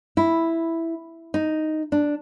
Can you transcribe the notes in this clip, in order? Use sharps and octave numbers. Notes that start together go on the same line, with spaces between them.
E4
D#4
D4